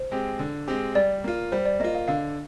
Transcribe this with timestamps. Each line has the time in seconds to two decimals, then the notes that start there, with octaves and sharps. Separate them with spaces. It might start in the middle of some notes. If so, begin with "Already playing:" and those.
Already playing: C5
0.11 G#3 C4 G4
0.39 D3
0.68 G#3 C4 G4
0.95 G3 D5
1.24 A#3 F4
1.52 G3 C5
1.66 D5
1.80 A#3 F4 D#5
1.95 F5
2.08 D3 F5